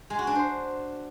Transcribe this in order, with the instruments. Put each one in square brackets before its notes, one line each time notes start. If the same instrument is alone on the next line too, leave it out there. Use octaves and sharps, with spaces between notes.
[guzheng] G#3
F#4
D4
C5